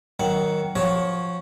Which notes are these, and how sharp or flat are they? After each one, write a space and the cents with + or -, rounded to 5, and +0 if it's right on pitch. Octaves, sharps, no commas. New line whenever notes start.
D#3 +0 F#3 +25 F#5 +0
F3 +10 F#4 +25 C#5 +0